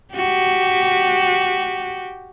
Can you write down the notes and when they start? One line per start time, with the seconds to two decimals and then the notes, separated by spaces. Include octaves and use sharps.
0.14 F#4 G4